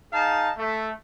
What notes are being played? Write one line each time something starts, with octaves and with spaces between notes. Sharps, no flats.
D#4 G#4 F5 A5
A3